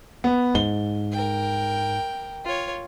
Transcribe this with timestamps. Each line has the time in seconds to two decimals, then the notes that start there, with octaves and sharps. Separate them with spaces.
0.24 B3
0.55 G#2 G7
1.12 A#4 G5
2.44 F4 C#5